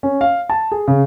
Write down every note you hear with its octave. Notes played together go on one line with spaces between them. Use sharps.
C#4
F5
A5
G#4
C#3